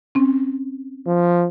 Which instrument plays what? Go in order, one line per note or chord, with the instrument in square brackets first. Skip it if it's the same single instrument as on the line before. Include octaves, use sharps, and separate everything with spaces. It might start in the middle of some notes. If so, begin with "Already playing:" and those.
[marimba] C4 C#4
[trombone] F3